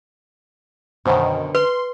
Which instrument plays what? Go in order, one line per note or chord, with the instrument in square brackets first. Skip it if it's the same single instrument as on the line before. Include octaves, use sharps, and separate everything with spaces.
[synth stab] F#2 B2 D#3 [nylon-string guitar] D3 C5 D#5
[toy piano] B4 [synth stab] C6